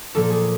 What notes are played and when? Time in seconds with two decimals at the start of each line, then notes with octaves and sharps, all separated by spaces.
0.15 A#2 F3 A#3 A4
0.30 G#4